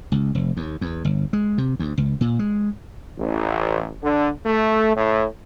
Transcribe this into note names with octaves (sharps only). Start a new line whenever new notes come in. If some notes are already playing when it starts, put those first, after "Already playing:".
C#2
F1
D#2
E2
G1
G#3
C3
D2
C#2
A#2
G#3
A1
D3
A3
A2